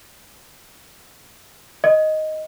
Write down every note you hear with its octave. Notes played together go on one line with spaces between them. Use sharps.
D#5